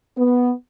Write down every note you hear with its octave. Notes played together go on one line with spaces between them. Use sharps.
B3